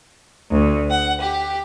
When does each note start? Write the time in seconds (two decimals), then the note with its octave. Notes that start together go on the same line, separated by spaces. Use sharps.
0.51 D2
0.90 F#5
1.21 G4